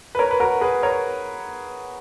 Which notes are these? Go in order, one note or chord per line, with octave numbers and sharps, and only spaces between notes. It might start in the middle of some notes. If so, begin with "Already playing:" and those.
B4
A#4 C#5
B4
F#4 A#4
G#4 B4
A#4 C#5